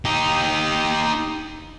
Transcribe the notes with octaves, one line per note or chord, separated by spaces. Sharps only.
D#4 G4